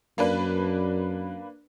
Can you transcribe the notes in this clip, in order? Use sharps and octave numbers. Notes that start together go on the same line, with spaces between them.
F#2 A#3 D4 B4